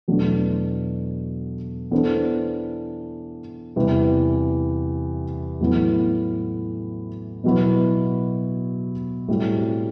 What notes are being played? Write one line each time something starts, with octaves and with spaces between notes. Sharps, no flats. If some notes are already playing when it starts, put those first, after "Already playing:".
E2 B2 F#3 A3 D4
E3 B3 D4 A4 C5
E2 C3 E3 G3
A2 F#3 B3 E4
B2 F#3 B3 E4 B4
A2 G3 C4 F#4